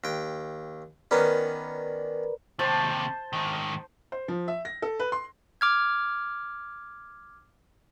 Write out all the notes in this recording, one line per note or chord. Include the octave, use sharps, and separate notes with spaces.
D#2 G5
D#3 B3 C#4 A#4 B4 D5
D#2 C3 C5 A5
G#2 D#3
C5
F3
E5
A#6
A4
B4
C6
D6 F6 G#6